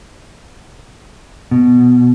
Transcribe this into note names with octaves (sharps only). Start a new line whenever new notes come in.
B2